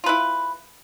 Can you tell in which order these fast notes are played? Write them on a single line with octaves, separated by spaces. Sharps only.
F4 B4 E4